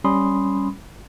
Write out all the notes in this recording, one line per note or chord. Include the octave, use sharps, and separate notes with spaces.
G3 C#4 B5 C6 D#6